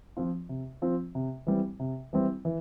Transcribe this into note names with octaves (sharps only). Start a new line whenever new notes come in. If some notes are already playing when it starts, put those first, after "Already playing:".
F3 C4 F4
C3
F3 C4 F4
C3
E3 G3 C4 E4
C3
E3 G3 C4 E4
E3